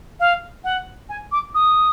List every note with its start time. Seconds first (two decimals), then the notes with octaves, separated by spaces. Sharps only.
0.20 F5
0.64 F#5
1.09 G#5
1.32 D6
1.55 D#6